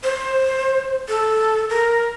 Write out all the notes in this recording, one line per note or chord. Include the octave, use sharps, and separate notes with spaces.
C5
A4
A#4